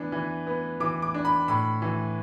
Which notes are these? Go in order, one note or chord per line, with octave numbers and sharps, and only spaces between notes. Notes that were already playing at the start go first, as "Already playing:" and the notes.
Already playing: E3 B3 D4
E3
B3
E3 D6
D6
D4
B5
A2 B5
E3